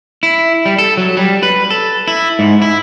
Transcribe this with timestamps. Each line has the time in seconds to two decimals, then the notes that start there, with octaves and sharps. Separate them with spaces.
0.23 E4
0.66 G3
0.78 A4
0.97 F#3
1.17 G3
1.43 B4
1.71 A4
2.07 E4
2.39 G#2
2.62 E4